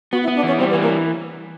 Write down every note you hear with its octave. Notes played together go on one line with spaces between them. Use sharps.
B3 F#4
E4
B3
D4
E3 C#4
G3 C4
B3
E3
A#3